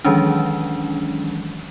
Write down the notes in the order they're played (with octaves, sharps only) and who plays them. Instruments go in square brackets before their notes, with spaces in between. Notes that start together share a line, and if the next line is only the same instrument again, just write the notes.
[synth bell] D#3 E3 F#3 G#3 C#4 D4